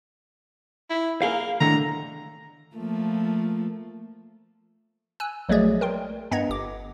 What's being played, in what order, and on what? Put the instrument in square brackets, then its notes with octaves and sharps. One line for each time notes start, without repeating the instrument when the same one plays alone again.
[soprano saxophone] E4
[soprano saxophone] A#3 [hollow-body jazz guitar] G#4 F5
[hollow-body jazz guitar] A2 D3 D#3 [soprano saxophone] A#5
[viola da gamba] F3 A3 A#3
[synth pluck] G#5 E6 F#6
A#1 F#3 G#3 A3 G#4 D5
A#4 G5 C6
G2 B3 D#5 F#5 A#5 G#6
G1 D6